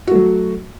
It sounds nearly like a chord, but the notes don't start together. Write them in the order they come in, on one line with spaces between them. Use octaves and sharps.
F#4 A3 F#3